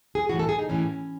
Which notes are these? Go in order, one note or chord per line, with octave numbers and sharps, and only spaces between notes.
G#4
A2 E3 F#4
A4
G#4
D#4
A2 E3 C#4